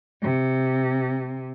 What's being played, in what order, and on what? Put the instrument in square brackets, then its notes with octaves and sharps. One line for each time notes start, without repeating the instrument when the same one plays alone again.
[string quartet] C3